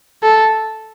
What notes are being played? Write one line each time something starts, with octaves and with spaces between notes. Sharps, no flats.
A4